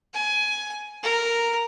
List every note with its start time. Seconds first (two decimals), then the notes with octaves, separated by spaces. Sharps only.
0.14 G#5
1.03 A#4